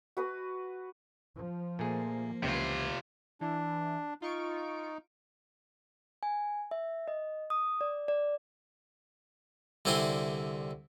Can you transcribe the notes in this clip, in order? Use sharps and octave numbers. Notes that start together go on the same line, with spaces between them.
F#4 B4 D#6
F3
A#2 A3 A#3 G#4
C#2 C3 E3 F4
E3 D4
D#4 F4 C#6 D7
G#5
E5
D#5
D#6
D5
D5
C2 D3 C4 E4 G#5 C6